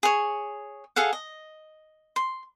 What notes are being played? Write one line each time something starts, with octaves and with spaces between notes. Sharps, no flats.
G#4 C#5
G#4 A4 F5 F#5
D#5
C6